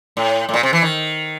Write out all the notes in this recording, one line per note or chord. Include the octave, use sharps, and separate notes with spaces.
A2
A2
A#2
C3
E3
D#3